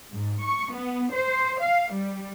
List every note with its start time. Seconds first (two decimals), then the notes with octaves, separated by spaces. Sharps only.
0.13 G#2
0.43 C#6
0.73 B3
1.14 C5
1.62 F5
1.93 G3